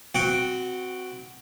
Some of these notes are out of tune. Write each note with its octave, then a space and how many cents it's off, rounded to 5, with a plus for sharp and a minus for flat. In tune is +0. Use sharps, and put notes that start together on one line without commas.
C4 -25 F#4 +0 G5 +0